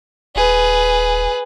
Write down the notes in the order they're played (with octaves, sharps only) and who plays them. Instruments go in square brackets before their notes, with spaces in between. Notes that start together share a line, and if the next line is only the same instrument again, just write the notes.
[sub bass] D#1 [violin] G#4 B4